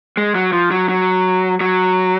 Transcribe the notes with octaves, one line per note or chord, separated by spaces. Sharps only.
G#3
F#3
F3
F#3
F#3
F#3